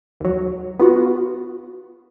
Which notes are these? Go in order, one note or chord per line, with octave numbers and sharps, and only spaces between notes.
D#2 F#3
B3 F4 F#4